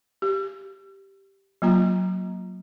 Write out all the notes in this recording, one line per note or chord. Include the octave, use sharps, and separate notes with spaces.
G4
F#3 A#3 F4 A#5